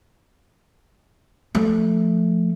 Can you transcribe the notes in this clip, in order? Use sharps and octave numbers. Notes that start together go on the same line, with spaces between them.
F3 A3